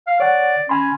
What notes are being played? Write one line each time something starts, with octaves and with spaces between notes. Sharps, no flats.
F5
C#5 D5 F#5
C#4 G#5 B5 C6